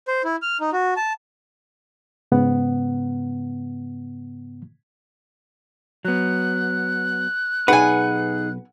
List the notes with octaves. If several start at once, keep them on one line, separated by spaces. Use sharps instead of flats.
C5
E4
F6
D#4
F#4
A5
G#2 C#3 B3 F#5
F#3 B3 F#6
B1 D#4 G#4 B4 F#5 G#5